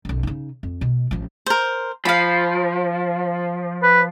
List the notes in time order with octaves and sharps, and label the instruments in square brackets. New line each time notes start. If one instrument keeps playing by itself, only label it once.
[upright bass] B1 F#2
C#3 D#4
F2
B2 G#3
A1 F3
[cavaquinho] A#4 C5
[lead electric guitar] F3 [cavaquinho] F5 B5
[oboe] B4